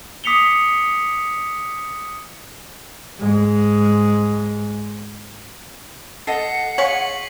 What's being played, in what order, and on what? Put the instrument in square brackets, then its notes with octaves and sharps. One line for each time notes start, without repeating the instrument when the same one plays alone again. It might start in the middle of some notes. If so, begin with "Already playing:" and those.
[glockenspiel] D6 D#6 B6 C#7 F7 G7
[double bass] G#2 G#3
[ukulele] A4 D#5 [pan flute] F#5 [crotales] C7
[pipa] G#3 C#5 [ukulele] F5 [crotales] C#6 B6 F#7